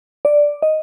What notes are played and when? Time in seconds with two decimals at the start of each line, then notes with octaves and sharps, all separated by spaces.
0.25 D5
0.62 D#5